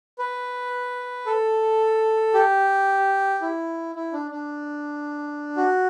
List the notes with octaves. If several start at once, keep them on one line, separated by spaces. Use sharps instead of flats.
B4
A4
G4
E4
E4
D4
D4
F#4